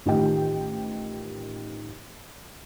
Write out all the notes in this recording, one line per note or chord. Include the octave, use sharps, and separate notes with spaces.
A1 D#3 F4 G4 D#5 G5